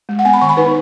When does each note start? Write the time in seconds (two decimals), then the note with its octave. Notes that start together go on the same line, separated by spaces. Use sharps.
0.09 G#3
0.19 F#5
0.25 B3 G#5
0.34 B5
0.41 D#3 C#6
0.49 B5
0.57 D#4 B4